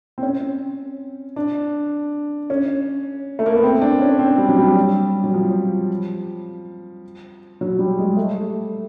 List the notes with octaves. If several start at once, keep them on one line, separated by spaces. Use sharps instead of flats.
C4
C#4
D4
C#4
A3
A#3
B3
C4
D4
C#4
C4
G3
F#3
G3
F#3
F3
F#3
G3
G#3
A3